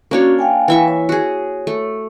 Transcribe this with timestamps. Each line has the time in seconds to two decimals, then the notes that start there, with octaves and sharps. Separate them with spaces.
0.11 A#3 C#4 D4 F#4 C#5
0.39 F5 G5 G#5
0.68 E3 E5 C#6
0.88 C#5
1.09 F#4 G#4
1.67 A3